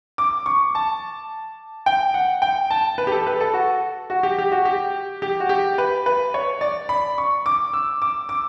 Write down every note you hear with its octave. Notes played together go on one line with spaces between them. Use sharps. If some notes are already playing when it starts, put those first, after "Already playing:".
D6
C#6
A5
G5
F#5
G5
A5
B4
G4
A4
B4
A4
F#4
F#4
G4
G4
F#4
G4
G4
F#4
G4
B4
B4
C#5
D5
B5
C#6
D6
E6
D6
D6